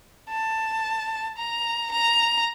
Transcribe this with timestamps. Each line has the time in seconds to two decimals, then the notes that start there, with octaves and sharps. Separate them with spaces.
0.30 A5
1.38 A#5
1.92 A#5